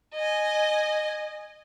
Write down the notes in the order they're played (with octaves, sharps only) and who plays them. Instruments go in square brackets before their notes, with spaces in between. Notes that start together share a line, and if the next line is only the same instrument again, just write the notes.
[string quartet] D#5 G#5